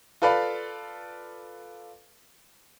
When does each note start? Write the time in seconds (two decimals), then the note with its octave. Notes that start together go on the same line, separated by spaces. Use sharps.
0.22 F4 A4 B4 D5 F5 B5